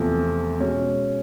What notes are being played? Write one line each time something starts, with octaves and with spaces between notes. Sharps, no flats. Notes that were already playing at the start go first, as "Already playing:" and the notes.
Already playing: E2 C3 F3 A3
B2 G#3 C#4